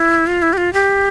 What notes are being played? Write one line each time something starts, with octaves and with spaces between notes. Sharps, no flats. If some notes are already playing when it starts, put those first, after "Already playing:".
Already playing: E4
F4
E4
G4
F4
G4